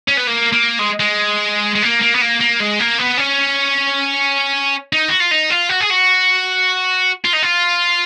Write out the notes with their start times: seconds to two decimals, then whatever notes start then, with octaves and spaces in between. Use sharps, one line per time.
0.08 C#4
0.17 B3
0.27 A#3
0.53 A#3
0.79 G#3
1.00 G#3
1.76 G#3
1.83 A#3
2.02 A#3
2.15 B3
2.21 A#3
2.40 A#3
2.60 G#3
2.79 A#3
2.98 B3
3.18 C#4
4.93 D#4
5.09 F#4
5.20 F4
5.31 D#4
5.50 F4
5.69 F#4
5.80 G#4
5.90 F#4
7.25 F4
7.34 D#4
7.43 F4